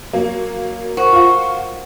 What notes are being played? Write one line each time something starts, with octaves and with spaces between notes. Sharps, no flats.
F#3 A#3
F#4 A#4 C5
F4